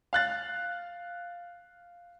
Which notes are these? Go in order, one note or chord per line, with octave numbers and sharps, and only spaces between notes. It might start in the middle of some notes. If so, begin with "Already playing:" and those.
F5 F#6 A6